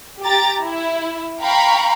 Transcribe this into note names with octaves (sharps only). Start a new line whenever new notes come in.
G4 A#5 A6
E4
F5 G5 A#5 B5 C#6